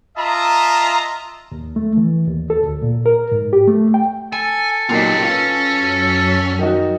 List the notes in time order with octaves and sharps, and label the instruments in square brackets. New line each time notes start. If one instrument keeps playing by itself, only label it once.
[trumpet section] F4 D#5 E5 A5 A#5
[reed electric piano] D#2
A3
E3
D#2
A4
D2
A#2
A#4
G#2
G4
A3
G5
[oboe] A4 [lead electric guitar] G#5
[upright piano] A#2 F#3 D#4 [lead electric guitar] F4 G4
[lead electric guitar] C#4 [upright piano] F4 B4
[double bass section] F#2 F#3
[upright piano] D#3 D#4 F#4